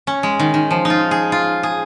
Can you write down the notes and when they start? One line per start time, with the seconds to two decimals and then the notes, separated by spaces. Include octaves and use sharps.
0.07 C#4
0.23 G#3
0.40 D#3
0.54 D#3
0.71 F3
0.85 D#4
0.90 F4
1.11 G#4
1.32 F4
1.63 G#4